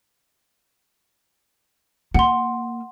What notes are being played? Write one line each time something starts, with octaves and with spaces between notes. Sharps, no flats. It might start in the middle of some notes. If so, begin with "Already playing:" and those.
A#3 F#5 C6